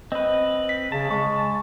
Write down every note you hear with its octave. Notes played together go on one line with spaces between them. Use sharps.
C4 B4 D#5
B6
C#3 A5
G#3 C#6